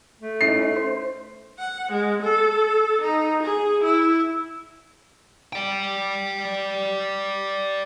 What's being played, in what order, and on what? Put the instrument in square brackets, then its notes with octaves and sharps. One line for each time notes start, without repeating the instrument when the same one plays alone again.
[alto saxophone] A3
[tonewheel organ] C#4 D#4 E4 [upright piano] C7
[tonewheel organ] C5
[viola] F#5
G#3
A4
D#4
G#4
E4
[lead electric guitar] D5 G5